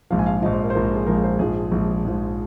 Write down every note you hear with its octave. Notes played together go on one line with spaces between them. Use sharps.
A#1 G#2 F3 F5
G#5
F5
A#1 G#2 F3 D#5
C5
A#4
C5
A#1 G#2 F3 A#4
G#4
A#1 G#2 F3 A#4
C5
A#1 G#2 F3 G#4
A#1 G#2 F3
A#1 G#2 F3